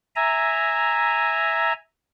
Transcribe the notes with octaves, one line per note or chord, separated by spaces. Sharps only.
E5 G#5 A#5